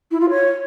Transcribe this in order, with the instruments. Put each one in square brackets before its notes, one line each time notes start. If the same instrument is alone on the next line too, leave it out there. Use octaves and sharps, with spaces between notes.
[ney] E4
F4
C#5